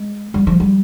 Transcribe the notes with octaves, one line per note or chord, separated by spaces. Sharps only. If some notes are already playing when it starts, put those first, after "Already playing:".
Already playing: G#3
G3
F3
G3